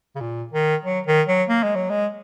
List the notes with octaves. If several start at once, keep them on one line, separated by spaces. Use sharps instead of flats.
C#3
A#2
D#3
F#3
D#3
F#3
A#3
G#3
F#3
G#3